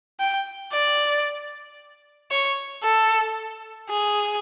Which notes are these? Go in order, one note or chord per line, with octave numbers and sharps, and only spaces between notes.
G5
D5
C#5
A4
G#4